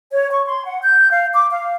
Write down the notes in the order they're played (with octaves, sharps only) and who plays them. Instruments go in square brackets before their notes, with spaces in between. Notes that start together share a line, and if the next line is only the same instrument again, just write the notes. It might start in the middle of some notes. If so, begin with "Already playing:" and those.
[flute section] C#5
C#6
C6
F#5
G6
F5
D6
F5